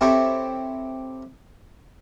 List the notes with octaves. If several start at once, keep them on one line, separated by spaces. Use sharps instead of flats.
C4 E4 G4 A4 C#5